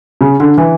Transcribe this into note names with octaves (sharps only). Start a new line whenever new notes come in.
C#3
D3
E3